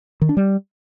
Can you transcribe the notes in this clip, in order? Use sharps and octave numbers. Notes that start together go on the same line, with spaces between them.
D#3
D4
G3